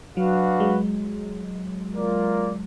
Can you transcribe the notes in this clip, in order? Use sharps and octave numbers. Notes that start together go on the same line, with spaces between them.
F#3 D4 F#4 B4 F5
G#3
A#3 F4 A#4 D5